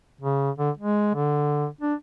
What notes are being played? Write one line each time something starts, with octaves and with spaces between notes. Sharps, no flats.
C#3
D3
G#3
D3
D4